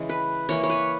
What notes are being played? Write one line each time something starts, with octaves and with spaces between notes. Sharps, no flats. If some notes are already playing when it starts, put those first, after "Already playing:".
Already playing: C#3 E3 G#3
B4
E3 A#3 C#5
C#5
B4